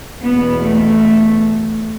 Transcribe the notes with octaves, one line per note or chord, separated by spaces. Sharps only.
E2 B2 B3
A3